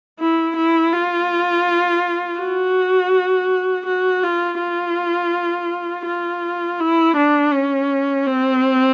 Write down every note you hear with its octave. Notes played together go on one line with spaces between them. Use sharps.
E4
E4
F4
F#4
F#4
F4
F4
F4
E4
D4
C#4
C4